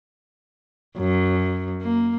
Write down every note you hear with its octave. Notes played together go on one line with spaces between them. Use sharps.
F#2
A#3